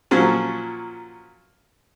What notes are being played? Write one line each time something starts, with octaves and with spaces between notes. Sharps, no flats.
A#2 F3 F#3 C#4